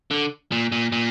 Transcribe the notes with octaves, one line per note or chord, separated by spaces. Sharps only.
D3
A#2
A#2
A#2